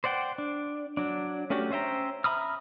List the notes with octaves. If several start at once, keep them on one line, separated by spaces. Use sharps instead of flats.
C5 D5 F#5 G5
D4
F#3 D4
A3 C#4 D4 F#4 G4
C#4 C5 E5 G5 A#5
E5 A#5 B5 D#6 F6